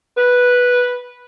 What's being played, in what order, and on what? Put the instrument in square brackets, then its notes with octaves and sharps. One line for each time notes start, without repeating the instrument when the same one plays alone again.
[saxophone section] B4